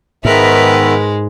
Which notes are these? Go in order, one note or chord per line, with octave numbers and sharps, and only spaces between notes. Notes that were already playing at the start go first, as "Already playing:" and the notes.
G#2 D#3 G#3 B3 A#4 B4 E5